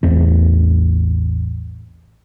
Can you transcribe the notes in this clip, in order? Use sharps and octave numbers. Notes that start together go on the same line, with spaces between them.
A1 E2 C4